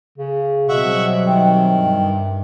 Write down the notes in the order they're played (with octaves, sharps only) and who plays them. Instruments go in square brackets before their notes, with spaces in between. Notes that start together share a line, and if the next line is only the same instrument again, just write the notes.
[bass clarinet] C#3
[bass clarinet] B2 [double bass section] F#3 G3 C4 [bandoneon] E5 F#5 C#6
[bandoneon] D#3 [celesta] E5 G5
[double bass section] G2